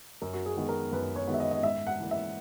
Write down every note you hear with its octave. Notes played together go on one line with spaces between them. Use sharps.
F#2 A#4
F#4
G#4
D#3 G#3 B3 F#4
A#4
F#2 B4
C#5
D#3 G#3 B3 F#4
E5
D#5
D#5
G#2 E5
F#5
E3 A#3
E5